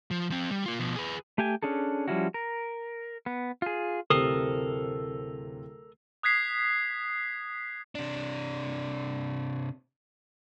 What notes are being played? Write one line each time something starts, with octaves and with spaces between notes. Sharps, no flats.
F3
F3 C4
G3
A#3 F4
B2 F3
G#4 B4
A3 G4 G5 G#5
C#4 D4 G#4 A4
F3 G3 C#4 E4 F#4
A#4
B3
F4 G#4
D1 C3 A4 A#4 D#6 C7
D#6 F#6 G#6 B6 C7
C3 D4